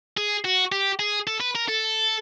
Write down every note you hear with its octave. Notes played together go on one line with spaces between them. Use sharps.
G#4
F#4
G4
G#4
A4
B4
A#4
A4